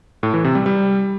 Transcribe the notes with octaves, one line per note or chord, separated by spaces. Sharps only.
A2
E3
C3
G3
G3